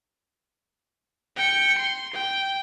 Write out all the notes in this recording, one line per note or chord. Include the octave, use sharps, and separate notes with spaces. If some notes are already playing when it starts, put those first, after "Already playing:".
G5 C#7
C6
G5